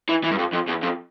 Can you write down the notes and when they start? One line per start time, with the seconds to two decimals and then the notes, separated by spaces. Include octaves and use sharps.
0.09 E3
0.24 E3
0.31 G2
0.38 F2
0.53 F2
0.67 E2
0.82 F2